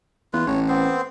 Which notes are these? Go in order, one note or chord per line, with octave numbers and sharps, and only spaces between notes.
E2 F4 B4
A1 C#5
B3 C4 C5